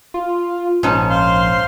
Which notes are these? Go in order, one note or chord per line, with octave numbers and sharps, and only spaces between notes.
F4
A#1 G#2 C#4 A5
C5 F5 C6